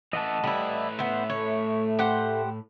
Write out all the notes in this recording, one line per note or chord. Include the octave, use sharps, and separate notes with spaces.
E3 A3 D#5 F#5 A5
A2 G3 E4 B4
B3 C5 E5
A3 C#5
G4 C5 F#5